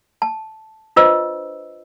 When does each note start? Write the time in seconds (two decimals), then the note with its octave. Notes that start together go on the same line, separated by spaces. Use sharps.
0.22 A5
0.96 D4 F4 B4 C5 D#5 E6